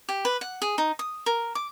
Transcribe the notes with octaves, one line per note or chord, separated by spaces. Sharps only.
G4
B4
F#5
G#4
D#4
D#6
A#4
D6